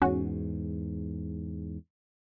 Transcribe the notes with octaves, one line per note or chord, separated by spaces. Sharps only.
E2 G#2 C#4 F#4